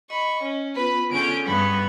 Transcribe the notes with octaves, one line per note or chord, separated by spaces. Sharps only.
D#5 B5 C#6
C#4
B3 F4 B4 B5
D3 G#3 C#4 G6 D7
G2 G3 B3 B5 C#6